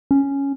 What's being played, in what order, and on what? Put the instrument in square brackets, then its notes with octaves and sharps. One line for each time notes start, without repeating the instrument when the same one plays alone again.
[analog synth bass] C#4